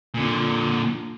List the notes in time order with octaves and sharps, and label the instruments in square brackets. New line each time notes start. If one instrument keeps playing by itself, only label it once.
[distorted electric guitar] A#2 D3